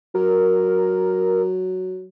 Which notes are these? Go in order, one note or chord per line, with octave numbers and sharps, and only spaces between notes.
F#3 A#4